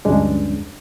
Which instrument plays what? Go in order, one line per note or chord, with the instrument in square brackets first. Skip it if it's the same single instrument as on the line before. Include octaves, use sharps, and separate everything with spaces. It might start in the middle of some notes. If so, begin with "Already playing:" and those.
[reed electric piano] D2 G2 F3 G#3 C#4 D4